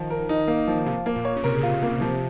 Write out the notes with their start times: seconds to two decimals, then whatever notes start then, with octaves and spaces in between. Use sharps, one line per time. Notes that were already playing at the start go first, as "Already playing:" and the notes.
Already playing: D#3 F3
0.10 A#4
0.29 D#4
0.48 A#3
0.68 F3
0.86 C3 F4
1.06 A#3
1.16 A#2
1.25 C#5
1.36 C#3
1.44 C3 A#4
1.58 C#3
1.63 F4
1.73 C3
1.82 A#2 A#3
2.01 C3 F3